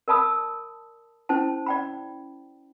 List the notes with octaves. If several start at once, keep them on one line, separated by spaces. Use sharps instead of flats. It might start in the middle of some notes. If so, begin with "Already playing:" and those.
A#4 D5 A5 B5 D#6 E6
C#4 E4 C5 A5
D5 G5 B5